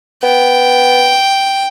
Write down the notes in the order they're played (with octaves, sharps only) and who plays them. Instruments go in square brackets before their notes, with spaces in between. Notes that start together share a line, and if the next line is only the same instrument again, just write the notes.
[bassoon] B3 [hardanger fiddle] G5